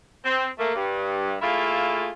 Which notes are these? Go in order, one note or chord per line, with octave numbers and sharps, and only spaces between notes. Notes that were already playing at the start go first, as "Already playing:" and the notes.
C4
A3 A#3
G2
A3 A#3 E4 F4 G#4